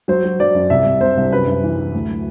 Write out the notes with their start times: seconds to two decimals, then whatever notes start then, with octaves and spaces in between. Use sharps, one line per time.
0.08 F#3 C5
0.24 F#3
0.40 F#3 D5
0.55 F#2
0.70 C2 E5
0.86 C2
1.01 C3 C5
1.17 C2
1.32 F#2 B4
1.47 F#2
1.63 E3
1.78 E3
1.94 D2
2.10 F#3